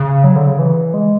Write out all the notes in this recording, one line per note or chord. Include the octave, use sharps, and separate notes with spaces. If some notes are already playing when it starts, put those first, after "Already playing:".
Already playing: C#3
F#3
D3
C#3
E3
G#3